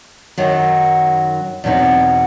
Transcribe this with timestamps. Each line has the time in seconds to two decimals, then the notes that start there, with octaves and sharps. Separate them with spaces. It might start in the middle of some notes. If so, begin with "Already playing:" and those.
0.37 F#2 D#3 F#3
1.64 E2 B2 F#3 C4 D#4